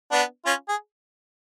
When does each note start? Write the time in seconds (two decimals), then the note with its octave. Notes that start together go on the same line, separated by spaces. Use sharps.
0.11 B3 D4
0.45 C#4 F4
0.68 G#4